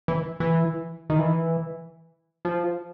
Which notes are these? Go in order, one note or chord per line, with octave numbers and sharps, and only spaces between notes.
E3
E3
D#3
E3
F3